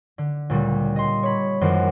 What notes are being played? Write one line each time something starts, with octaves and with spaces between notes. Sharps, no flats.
D3
D2 A#2 C#3 G3
D#5 C6
C#5 B5
A#1 F#2 D#3 E3 C5 D6